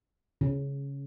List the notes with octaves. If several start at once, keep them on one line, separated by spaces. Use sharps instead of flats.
C#3